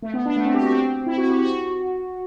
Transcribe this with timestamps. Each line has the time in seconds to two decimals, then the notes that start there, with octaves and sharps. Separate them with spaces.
0.02 A3
0.14 B3
0.25 D4
0.36 A3
0.45 C4
0.54 G4
0.62 F#4
0.71 C4
1.07 E4
1.18 F#4
1.30 G4
1.41 F#4